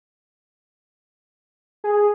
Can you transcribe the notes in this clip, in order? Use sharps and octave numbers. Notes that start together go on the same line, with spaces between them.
G#4